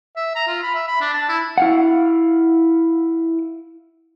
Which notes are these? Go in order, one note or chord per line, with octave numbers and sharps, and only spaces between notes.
E5
A#5
F4
B5
E5
B5
D4
A5
E4
E4 F5 F#5